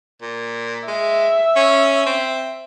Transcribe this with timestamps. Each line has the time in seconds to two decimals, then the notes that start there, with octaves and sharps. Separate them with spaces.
0.22 A#2
0.88 G#3 E5
1.56 C#4
2.06 C4